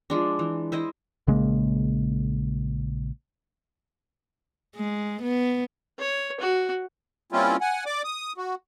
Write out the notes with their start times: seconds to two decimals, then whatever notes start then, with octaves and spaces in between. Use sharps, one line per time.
0.10 F3 G#3 D4
0.39 E3
0.72 E4 C5 D#5
1.27 A#1 C#3 G#3 A#3
4.76 G#3
5.22 B3
5.99 C#5
6.40 F#4
7.32 G3 A#3 C4 C#4 E4 F4
7.61 F#5 G#5
7.86 D5 D6
8.04 D#6
8.37 F#4